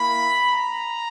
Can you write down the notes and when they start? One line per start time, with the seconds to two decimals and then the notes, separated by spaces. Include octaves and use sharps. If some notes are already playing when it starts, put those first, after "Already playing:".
Already playing: A#3 E4 B5
0.52 A#5